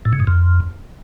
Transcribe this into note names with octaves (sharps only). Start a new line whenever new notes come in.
A2
C#3
G#2
F2